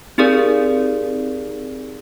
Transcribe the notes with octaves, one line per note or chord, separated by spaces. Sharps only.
C4 D#4 G4 G#4 A#4 D5